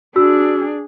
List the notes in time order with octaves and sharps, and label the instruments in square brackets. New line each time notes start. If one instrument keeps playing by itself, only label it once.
[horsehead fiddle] D4 G#4 [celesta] F#4 E6